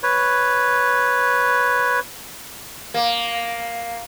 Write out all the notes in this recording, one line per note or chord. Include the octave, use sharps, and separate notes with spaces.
B4 C#5
A#3